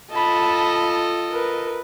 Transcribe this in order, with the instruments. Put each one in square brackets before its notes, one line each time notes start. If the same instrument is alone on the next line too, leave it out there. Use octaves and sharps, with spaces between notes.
[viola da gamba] F4 A4 D#5 [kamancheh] A5 B5
[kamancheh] A#4 B4